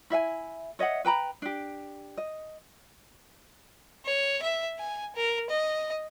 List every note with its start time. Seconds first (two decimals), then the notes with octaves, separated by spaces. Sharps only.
0.10 E4 E5 F5 G#5
0.79 C#5 D#5 E5 F#5
1.05 B4 G5 A#5 B5
1.42 D4 G4
2.17 D#5
4.05 C#5
4.42 E5
4.79 G#5
5.16 A#4
5.50 D#5